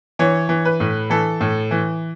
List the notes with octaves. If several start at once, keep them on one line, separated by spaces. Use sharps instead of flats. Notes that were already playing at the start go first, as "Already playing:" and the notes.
E3 C#5
E3
B4
A2
E3 A4
A2
E3